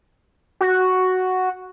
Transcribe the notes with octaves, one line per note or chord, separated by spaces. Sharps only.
F#4